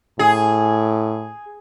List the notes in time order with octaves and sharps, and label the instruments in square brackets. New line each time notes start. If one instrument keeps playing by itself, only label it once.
[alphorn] A2 [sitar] G#4